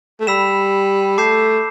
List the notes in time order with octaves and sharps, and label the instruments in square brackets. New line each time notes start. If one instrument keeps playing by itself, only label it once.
[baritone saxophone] A3
[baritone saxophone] G3 [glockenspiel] B5 E6 B6 E7
[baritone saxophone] A3 [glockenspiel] A5 D6 G6 C7 E7